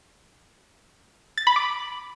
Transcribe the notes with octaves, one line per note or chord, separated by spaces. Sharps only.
A6
B5
D6